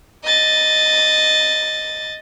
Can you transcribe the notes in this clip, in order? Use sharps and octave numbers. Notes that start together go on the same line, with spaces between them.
D#5 A6